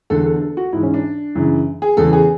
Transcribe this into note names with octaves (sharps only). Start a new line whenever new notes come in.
E2 D3 A4
A4
A4
F#4
G#2 E3 E4
C#4
D4
F#2 C#3 E3
G#4
E2 C#3 E3 A4
G#4